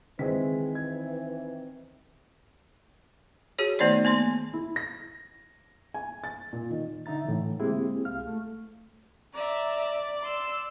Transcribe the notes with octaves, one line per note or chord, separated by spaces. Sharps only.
D#3 E3 G#3 C4 G#4 B6
G#6
F#4 G#4 C#5
D#3 A3 B3 D#4 C5 D5
A#3 B3 C6
E4
A#6
G#5
A6
A#2
D#3
D3 D#4 E5 A#5 A6
A2 D3 E3
G#3 A#3 C4 E4 G4 G#4
C2 F5 F6
A3
D5 E5 A#5
C6 E6